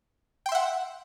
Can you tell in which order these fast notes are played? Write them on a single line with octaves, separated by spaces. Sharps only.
G5 C6 E5 F#5